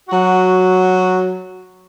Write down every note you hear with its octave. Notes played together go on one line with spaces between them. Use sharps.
F#3 F#4